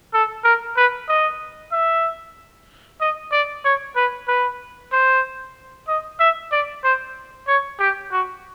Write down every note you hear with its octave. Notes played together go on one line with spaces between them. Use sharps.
A4
A#4
B4
D#5
E5
D#5
D5
C#5
B4
B4
C5
D#5
E5
D5
C5
C#5
G4
F#4